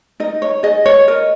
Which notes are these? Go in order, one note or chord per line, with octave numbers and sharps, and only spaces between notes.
D#4 D#5
C#5
G#4 D#5
C#5
A#4 D#5